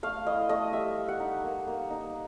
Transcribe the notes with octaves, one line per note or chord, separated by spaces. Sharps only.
A3 F5
E4 D#5
A3 D#5
G3 E5
G3
F#5
D#4
A#3
A#3
D#4